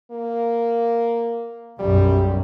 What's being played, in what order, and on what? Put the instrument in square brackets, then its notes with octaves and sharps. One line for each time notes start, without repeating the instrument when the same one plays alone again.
[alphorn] A#3
[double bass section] B1 F#2 [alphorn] G3